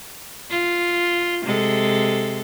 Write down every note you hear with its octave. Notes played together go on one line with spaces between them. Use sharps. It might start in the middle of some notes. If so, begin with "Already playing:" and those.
F4
C3 G#3 A4